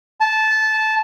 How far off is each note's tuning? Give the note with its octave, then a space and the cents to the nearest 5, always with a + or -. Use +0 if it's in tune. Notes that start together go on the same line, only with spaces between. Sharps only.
A5 -15